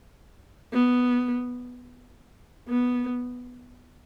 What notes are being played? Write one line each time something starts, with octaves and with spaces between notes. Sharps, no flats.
B3
B3